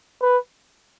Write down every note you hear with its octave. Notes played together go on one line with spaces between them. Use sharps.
B4